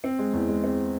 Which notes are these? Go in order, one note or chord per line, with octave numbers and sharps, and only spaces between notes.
C4
G#3
E2
G#3
C4